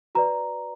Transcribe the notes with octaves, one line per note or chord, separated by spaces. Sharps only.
F#4 B4 D5 A#5